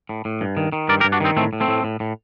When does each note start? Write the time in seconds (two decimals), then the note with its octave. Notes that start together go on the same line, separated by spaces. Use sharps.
0.09 A2
0.25 A2
0.41 G2
0.57 D#3
0.72 D#3
0.89 G2 A#4 D5
1.00 G4 A#4
1.05 G2
1.12 D4 F#4
1.20 D#3 C4 D#4
1.37 A2 A3 C4
1.53 A2
1.60 A3 C4
1.68 A2
1.84 A2
2.00 A2